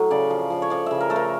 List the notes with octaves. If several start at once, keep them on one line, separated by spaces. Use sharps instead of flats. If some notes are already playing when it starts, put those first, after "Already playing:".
Already playing: A2 F#3
C#3 D5
F3
F3
C#5
F3 D5
C#3 E5
A#4
A3 A4
A#4